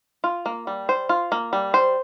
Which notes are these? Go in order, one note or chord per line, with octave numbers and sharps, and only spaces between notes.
F4
A#3
G3
C5
F4
A#3
G3
C5